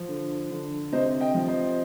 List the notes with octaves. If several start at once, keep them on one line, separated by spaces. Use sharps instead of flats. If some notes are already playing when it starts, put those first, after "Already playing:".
Already playing: F3
D3
D3
C3 C5 D#5
D#5 G5
F3
C5 D#5